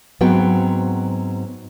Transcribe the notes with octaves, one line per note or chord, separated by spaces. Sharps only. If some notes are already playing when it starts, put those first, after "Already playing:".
G#2 F#3 B3 C4 G5